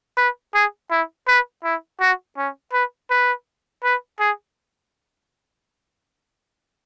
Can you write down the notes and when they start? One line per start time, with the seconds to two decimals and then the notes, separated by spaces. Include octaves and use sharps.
0.17 B4
0.54 G#4
0.91 E4
1.28 B4
1.64 E4
2.01 F#4
2.38 C#4
2.73 B4
3.10 B4
3.84 B4
4.20 G#4